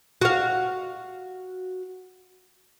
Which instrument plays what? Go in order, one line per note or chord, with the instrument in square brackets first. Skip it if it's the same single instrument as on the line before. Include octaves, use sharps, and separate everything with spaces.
[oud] F#4 F5